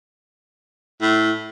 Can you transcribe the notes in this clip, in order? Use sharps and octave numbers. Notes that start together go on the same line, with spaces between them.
A2